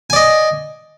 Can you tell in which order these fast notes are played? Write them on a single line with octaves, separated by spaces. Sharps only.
G#5 D5 D#5